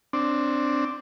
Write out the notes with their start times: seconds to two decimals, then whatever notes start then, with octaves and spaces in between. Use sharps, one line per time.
0.13 C4 D4